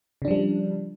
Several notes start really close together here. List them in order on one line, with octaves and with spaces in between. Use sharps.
C#3 D4 F3 G3